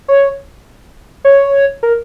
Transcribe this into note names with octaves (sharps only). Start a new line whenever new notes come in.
C#5
C#5
A#4